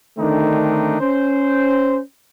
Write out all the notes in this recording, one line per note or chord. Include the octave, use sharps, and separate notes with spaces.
D3 D#3 A3 C4 D4 D#4
C#4 C5